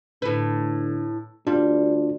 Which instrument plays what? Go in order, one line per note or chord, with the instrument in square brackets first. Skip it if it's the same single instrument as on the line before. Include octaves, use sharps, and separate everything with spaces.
[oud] A2 B4 [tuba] D3
[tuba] D2 [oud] G3 [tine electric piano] D4 F4